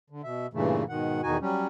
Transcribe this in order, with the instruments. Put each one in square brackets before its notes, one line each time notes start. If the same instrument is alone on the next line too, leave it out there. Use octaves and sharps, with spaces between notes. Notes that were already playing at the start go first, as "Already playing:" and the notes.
[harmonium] D3
B2 E5
G2 A#2 C#3 E3 A3
G#2 B2 D#3 F#5
E2 B2 D#3 D#4 F#4 G#5
F#3 G3 C#4